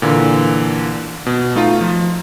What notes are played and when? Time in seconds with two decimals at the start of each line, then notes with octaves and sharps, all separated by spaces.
0.02 A#2 D3 E3
1.26 B2
1.55 A3 D#4 F4
1.81 F3